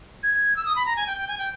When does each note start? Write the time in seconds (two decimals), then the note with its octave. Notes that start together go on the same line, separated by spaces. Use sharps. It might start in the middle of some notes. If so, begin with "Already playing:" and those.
0.23 G#6
0.56 E6
0.66 D#6
0.76 B5
0.86 A#5
0.96 G#5
1.07 G5
1.18 G5
1.28 G#5
1.38 G5